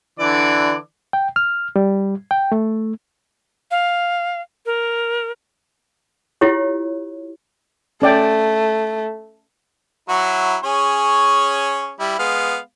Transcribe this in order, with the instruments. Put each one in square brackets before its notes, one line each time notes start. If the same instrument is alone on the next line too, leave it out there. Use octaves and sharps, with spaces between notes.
[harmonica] D3 E3 D5
[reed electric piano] G5
F6
G3
G5
A3
[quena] F5
A#4
[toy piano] E4 F4 G4 C#5
[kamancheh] A3 [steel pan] C#4 D5 G5
[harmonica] F#3 E4 F#4
C#4 G#4 C#5
G3 E4
G#3 B3 F5